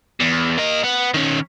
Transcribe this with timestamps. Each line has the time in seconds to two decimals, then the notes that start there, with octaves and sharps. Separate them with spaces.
0.20 E2
0.58 A#3 D#5
0.84 B3
1.14 D#3 C#4